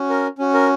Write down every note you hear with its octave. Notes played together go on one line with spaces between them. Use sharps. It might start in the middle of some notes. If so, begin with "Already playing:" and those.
Already playing: C#4 F#4
A#4
C#4 F#4
A#4